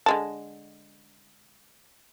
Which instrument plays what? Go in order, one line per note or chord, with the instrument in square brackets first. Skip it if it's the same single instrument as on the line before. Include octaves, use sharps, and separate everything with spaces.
[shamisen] D3 G#3 A5